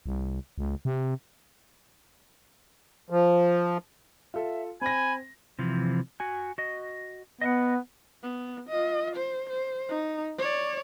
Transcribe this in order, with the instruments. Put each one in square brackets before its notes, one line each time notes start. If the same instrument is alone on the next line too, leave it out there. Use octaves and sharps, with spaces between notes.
[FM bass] C2
C#2
C3
[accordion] F3
[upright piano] F4 A4 [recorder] E5
[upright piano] C4 A#6 [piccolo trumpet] G#5 [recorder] B5
[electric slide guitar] C3 E3 F3
F#4 G#5
F#4 D#5
[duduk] B3 [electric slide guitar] D#5 E5 F#5
[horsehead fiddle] B3
F4 D#5
C5
C5
D#4
C#5 D5